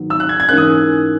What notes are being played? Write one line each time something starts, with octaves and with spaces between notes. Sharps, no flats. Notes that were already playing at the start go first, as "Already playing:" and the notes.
Already playing: G#2 D#3 F#3 B3
E6
F#6
G#6
G#6
G#2 E3 A#3 C#4 F#6
D#6